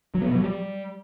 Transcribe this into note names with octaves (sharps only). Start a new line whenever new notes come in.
F#3
B3
B2
F#3
G3